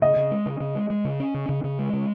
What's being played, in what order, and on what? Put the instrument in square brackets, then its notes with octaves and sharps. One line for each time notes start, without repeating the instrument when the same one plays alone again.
[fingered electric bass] C#3 [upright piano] D#5
[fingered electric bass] C#3
G#3
C#3
C#3
G#3
G#3
C#3
C#4
C#3
C#3
C#3
G#3
C#3